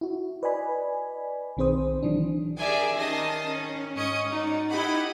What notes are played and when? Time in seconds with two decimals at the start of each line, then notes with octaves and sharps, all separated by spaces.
0.01 E4 F#4
0.43 B4 D5 D#5 G#5 B5
1.57 B1 D#3 C4 G#4 C5 D#6
2.03 D#3 E3 F#3 D4
2.58 G4 G#4 A#4 D5 E5 G#5
2.95 D#3 C#4 D#5 A5 A#6 C7
3.48 C#4
3.95 G#2 C#4 D#5 D#6 C#7
4.31 D#4 F#4 D5
4.70 D#4 E4 G4 D#5 F#5 B5